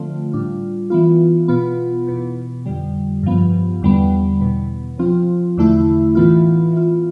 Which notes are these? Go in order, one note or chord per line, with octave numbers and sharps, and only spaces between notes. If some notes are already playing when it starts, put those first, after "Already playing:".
Already playing: D3 F3 A3 C4 F4
A2 G3 D4 F4
E3 B3 F4
B2 B3 F4
E2 B2 B3
F2 D3 G3
G2 F3 B3
E2 D3 G3 B3
E2 B2 B3
C3 F3 C4 F4
E2 D3 A3 E4
A2 E3 B3 F4
E3 B3 F4